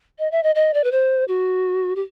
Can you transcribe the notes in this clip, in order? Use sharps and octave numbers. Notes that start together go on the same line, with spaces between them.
D#5
E5
D#5
D#5
D5
B4
C5
F#4
G4